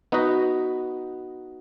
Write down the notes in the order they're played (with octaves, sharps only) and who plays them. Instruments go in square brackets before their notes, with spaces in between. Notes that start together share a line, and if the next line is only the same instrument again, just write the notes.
[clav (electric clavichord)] B3 D#4 F#4 B4 D#5